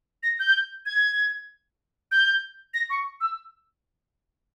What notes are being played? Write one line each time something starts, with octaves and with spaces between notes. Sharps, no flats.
A#6
G6
G#6
G6
A#6
C#6
E6